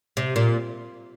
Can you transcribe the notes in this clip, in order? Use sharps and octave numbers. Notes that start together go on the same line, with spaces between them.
C3
A#2